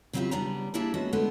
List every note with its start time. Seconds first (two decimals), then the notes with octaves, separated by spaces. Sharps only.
0.13 C#3 F#3 C4 E4 F4 G4
0.31 C#3 G3 B3 D4 G#5 A#5
0.74 A#3 D4 E4 G4 G#4 A5
0.94 G#3 B3 C#4 F#4 E5
1.13 D3 G#3 A3 B3 E4